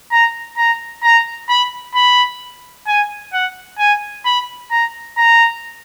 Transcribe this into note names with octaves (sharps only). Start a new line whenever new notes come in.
A#5
A#5
A#5
B5
B5
G#5
F#5
G#5
B5
A#5
A#5